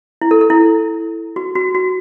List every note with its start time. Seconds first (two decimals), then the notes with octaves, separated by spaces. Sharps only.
0.21 E4
0.31 A4
0.41 A4
0.50 E4
1.36 F#4
1.55 F#4
1.75 F#4